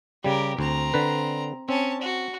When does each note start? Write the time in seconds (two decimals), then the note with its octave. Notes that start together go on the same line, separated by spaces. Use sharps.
0.24 C#3 G3 G4 A#4
0.59 D2 C4 A#5
0.94 D3 B4
1.69 C4 C#4 A5
2.01 F#4